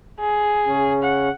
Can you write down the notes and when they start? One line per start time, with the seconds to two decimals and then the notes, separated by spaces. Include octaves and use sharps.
0.20 G#4
0.66 C#3 C#4
1.02 F#5